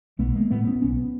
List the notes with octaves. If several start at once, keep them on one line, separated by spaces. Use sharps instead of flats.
B1 A3 B3
G#3 A#3
A2 A3 B3
B3 C#4
B1 B3 C#4